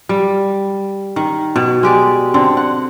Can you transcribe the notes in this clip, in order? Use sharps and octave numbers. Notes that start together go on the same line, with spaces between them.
G3
D#3
B2
G#3 G4 D5
D3 C4
F#5